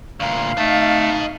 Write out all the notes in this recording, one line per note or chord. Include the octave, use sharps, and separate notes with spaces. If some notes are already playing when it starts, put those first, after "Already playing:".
D2 A#2 F5
A3 D#4 D#5 A5